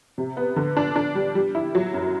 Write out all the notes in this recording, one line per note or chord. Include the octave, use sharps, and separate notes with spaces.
C3
B3
D3
D4
D4
G3
G3
E4
F#3
F#2